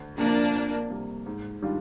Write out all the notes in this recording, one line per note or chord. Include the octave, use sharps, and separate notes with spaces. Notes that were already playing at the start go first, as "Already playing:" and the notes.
Already playing: D2
C3 F3 A#3 D4
F2
C3 G3 A#3
G#2
D#3 G3 D4 F4